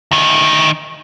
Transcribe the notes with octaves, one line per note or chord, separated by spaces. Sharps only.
D2 D#3